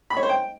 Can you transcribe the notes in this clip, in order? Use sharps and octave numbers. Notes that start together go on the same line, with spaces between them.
B5
C#5
C5
G5